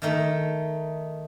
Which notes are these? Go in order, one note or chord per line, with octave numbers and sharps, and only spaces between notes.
D#3 A3 D#4